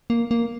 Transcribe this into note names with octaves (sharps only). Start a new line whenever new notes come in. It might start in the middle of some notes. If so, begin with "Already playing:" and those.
A#3
A#3